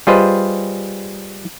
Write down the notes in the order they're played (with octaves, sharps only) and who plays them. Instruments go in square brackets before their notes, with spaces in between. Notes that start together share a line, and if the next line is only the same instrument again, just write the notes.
[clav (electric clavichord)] G3 F4 G#4 B4 C5 D#5